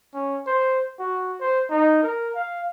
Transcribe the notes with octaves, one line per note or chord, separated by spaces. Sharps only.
C#4
C5
F#4
C5
D#4
A#4
F5